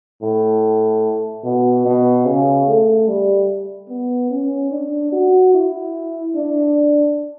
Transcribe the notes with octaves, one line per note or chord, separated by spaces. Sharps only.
A2
B2
B2
C#3
A3
G3
B3
C#4
D4
F#4
E4
D4